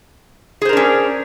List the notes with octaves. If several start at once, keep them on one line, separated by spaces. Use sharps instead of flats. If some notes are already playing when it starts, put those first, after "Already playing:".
C#4 D4 G#4 A#4 C5